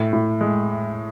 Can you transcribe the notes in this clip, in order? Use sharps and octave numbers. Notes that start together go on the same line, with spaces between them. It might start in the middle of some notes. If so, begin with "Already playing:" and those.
Already playing: A2
A2
G#3